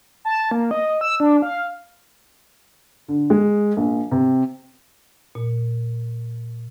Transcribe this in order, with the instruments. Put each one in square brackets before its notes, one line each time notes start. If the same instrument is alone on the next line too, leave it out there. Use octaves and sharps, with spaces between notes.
[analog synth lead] A5
A#3
D#5
E6
D4
F5
[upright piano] D3
G#3
A#1
C3
[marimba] A#2